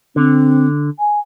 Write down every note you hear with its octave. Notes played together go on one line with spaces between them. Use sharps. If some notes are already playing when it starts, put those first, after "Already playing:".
D3 C4
G#5